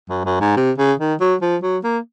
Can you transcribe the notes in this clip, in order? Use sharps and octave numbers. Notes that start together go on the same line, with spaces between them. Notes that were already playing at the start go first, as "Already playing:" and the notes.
F#2
F#2
G#2
C3
C#3
D#3
F#3
F3
F#3
A#3